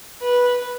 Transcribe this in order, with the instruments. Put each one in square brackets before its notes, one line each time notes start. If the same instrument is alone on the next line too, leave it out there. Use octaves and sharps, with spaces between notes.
[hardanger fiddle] B4